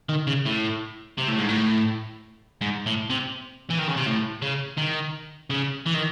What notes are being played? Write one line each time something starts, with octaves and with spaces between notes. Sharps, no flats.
D#3
C#3
A2
C3
A2
G#2
A2
G#2
A2
C3
E3
D#3
C#3
C3
A2
C#3
D#3
C#3
E3
D#3